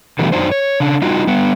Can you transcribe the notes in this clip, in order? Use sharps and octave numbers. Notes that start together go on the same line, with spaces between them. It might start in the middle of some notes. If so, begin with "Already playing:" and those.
B2 D3 E3 F#3 G3 A3
F#2 F#3 D4 D#4 C5
C#5
C#3 D4
G3 D#4 F4 F#4
G3 B3